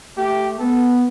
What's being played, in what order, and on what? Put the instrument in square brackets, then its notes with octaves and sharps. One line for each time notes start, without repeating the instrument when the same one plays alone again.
[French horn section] A3 [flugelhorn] G4
[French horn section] B3 [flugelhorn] A4